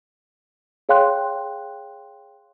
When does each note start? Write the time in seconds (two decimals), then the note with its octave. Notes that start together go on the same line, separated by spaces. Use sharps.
0.89 G#4 C#5 F5 G5 C6 F#6